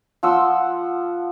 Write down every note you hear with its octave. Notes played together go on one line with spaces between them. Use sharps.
F3 F#5 C6 E6